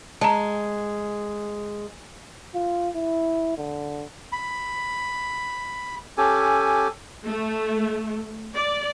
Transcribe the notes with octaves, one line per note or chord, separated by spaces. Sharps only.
G#3 A5 A#5
F4
E4
D3
B5
C#4 G4 A4 G#5
A3
D5